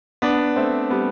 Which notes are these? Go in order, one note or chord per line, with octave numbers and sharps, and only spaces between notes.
B3 D4
A3 C4
G3 B3